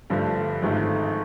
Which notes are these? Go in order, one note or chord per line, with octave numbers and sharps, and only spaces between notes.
G2 D3 F3 A3
G#1 G#2 F3 A3